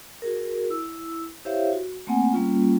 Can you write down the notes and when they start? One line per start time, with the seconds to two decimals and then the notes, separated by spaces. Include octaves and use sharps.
0.22 F#4 G#4 A#4
0.70 E4 E6
1.45 E4 G4 C5 C#5 E5 F5
1.73 F#4
2.07 A3 A#3 C4 F#5 G#5
2.33 G3 A#3 C#4 F4